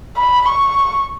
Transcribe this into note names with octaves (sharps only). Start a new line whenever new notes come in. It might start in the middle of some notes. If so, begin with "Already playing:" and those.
B5
C#6